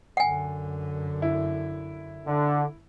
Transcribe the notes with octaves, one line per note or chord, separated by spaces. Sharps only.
F#2 D3 F#5 G#5
E4
D3